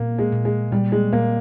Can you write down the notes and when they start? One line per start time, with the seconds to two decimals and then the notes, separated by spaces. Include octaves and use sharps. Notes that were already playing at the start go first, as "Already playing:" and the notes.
Already playing: A#2 A#3
0.18 G#3
0.32 A#2
0.45 G#3
0.72 A#2 G3
0.92 G#3
1.13 A#2 A#3